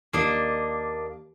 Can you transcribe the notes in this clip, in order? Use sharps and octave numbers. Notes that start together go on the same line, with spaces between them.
D#2 A#3 D4 D#5